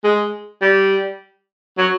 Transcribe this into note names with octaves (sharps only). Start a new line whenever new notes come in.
G#3
G3
F#3